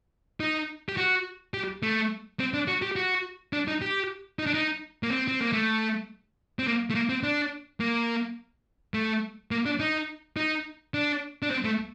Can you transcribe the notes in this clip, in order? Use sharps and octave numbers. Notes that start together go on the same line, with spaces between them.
D#4
G4
F#4
G4
A3
C4
D4
F#4
G4
F#4
D4
D#4
G4
D#4
D4
D#4
A#3
C4
C4
A#3
A3
C4
A#3
A3
A#3
C4
D4
A#3
A3
A#3
D4
D#4
D#4
D4
D4
C4
A3